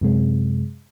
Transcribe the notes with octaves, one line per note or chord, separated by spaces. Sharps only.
F#2 C3 G#3